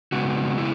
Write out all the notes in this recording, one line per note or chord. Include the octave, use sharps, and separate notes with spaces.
C#3 G#3 B3 F#4
E4